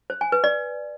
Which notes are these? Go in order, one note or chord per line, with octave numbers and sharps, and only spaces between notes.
C5
G#5
B4
D5